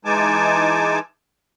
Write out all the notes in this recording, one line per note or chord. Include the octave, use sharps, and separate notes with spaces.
E3 G#3 D#4 G#5 A5 D6